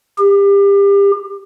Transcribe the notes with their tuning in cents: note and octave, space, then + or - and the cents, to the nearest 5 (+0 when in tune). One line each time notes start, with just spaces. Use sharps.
G4 +30